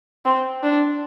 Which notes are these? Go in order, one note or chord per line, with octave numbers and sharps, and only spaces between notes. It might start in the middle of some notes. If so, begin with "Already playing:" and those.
C4
D4